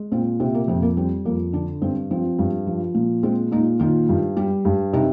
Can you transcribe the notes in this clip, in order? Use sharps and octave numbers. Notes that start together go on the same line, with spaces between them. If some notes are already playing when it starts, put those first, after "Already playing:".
Already playing: G#3
A#2 C4
C3 C4
A#3
F2 C4
A#3
G3 C4
F2 A#3
D3 D4
G2 C4
F3 C4
G2
F3
A#2
G#3 C4
A#2 D#4
D#3 F4
G2
G3
G2
C3 D#4